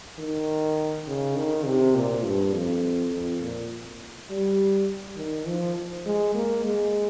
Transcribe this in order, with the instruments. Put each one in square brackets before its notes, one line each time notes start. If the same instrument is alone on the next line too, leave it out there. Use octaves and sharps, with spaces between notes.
[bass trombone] D#3
C#3
D#3
C3
A#2
G2
F2
F2
A#2
G3
D#3
F3
G#3
A#3
G#3